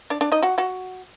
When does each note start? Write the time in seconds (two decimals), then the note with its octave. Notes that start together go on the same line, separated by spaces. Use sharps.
0.10 D4 D5
0.21 D4 D5
0.32 D#4 D#5
0.42 F#4 F#5
0.58 F#4 F#5